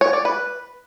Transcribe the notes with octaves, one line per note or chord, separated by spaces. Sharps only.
C#5
D5
B4